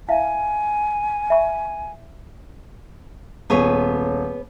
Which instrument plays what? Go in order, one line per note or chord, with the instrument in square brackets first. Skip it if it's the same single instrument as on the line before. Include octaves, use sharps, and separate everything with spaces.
[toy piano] E4 E5 F5 [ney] G#5
[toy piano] E5 B5 C#6
[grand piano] D#1 [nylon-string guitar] B3 G#4 C#5